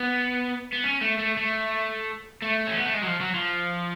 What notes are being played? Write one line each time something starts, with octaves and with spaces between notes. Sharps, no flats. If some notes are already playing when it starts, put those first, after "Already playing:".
Already playing: B3
B3
C#4
A3
A3
A3
A3
C#4
B3
A3
G#3
F#3
F3
F#3
F3